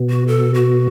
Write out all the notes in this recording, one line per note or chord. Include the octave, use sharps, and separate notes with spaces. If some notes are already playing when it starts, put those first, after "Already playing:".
Already playing: B2
F#4
A4
F#4